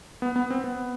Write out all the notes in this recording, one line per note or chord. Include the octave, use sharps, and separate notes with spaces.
B3
B3
C4
B3